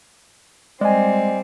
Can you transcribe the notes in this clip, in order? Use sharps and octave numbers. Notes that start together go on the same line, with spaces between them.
G3 G#3 C4 D5 D#5 G#5